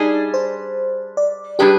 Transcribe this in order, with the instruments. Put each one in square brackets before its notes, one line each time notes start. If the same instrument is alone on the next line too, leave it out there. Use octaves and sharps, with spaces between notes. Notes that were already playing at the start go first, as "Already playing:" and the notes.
Already playing: [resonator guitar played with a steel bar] G3 D4 G#4 [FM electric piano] D#4
[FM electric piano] C5
D5
[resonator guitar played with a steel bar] G3 D4 G#4 B4 [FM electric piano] G4